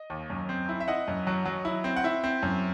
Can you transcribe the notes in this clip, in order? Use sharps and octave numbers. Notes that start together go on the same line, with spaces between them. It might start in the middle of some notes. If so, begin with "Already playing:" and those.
Already playing: D#5
D#2
F#2
C4
E4
E5
E4 D#5 F#5
F#2
F#3
F#3
E4
C4
F#5
E4 E5
C4
F#2